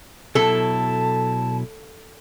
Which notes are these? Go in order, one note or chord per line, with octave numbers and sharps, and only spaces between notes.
B2 F#3 E4 A4 A5